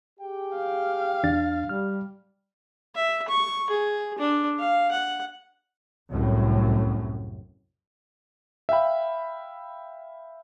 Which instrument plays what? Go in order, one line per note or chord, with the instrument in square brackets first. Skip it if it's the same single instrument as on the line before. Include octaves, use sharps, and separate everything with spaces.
[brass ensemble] G4 G#4 G5
[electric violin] F5
[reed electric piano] E2 D4 A6
[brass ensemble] G3 [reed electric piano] F6
[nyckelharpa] E5
C#6
G#4
D4
F5
F#5
[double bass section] C2 F#2 A2
[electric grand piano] E5 F5 G5 B5